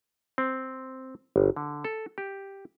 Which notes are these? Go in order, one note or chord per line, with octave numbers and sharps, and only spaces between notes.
C4
G1
D3
A4
G4